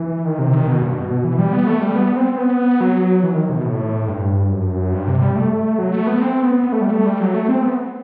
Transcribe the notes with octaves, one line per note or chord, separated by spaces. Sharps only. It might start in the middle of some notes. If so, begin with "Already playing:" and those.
Already playing: E3
D#3
C3
D#3
B2
G2
B2
B2
E3
G3
B3
A3
G3
B3
C4
B3
F#3
E3
D#3
C3
B2
A2
G2
F#2
G2
C3
G3
A3
F#3
A3
B3
C4
B3
B3
A3
G3
A3
G3
F#3
A3
C4
B3